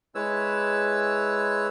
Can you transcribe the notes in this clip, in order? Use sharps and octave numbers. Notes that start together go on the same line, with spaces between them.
G#3 E4 B4 C#5 E6